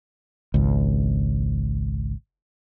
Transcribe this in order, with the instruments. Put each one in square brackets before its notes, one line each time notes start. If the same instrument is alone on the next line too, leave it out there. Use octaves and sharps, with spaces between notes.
[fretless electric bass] G#1 C#2